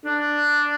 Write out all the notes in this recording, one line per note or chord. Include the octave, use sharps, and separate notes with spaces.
D4